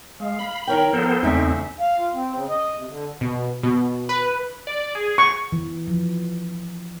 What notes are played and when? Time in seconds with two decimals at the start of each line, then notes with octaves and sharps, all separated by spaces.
0.20 G#3 F5
0.39 B5
0.67 D#3 A#4 C#5 G5
0.93 F3 B3 A4 C5
1.23 E2 C#3 A3 C4 D4 D#4 E5
1.80 F5
1.98 F4
2.14 C4
2.34 C#3
2.49 D#5
2.76 C3
2.88 D3
3.21 B2
3.63 B2
4.09 B4
4.67 D5
4.95 G#4
5.18 C#6
5.52 E3
5.88 F3